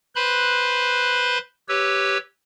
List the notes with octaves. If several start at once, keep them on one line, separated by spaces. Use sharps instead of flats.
B4 C5 B5 C6 F#6
G4 B4 C#5 E6